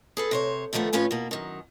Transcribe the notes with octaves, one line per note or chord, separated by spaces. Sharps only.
G#4 A4 B4
C3 C5 C#5
D3 D#3 F3 A3 B3
F2 A2 C#4 F4 B4 C#5
B2 A#3
F#2 D#3